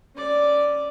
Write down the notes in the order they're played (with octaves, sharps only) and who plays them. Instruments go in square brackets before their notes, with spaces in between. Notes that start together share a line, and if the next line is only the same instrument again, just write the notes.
[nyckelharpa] C#4 D5